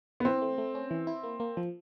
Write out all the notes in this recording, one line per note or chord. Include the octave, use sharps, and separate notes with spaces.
B3
E3 C4
A3
A3
C#4
E3
E4
A#3
A#3
F3